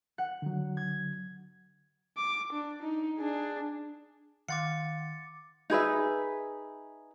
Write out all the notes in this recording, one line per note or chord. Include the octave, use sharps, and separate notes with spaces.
F#5
D3 F#3
G#6
D6
D4
D#4
D4 G#4
D#3 F5 F#5 C6 D6 A6 C#7
D#4 G#4 B4 E5